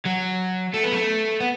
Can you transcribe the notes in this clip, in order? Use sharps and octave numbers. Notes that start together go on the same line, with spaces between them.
F#3
A3
B3
A3
B3